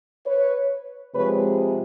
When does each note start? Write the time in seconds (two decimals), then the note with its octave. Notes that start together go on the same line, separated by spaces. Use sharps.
0.26 B4 C#5
1.15 C3 F3 G#3 B4 C#5